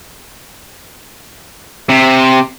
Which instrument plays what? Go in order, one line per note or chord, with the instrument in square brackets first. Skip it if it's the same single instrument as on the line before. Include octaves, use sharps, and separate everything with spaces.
[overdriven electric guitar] C3